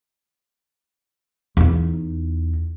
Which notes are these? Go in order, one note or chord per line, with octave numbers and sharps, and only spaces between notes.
E2 D#4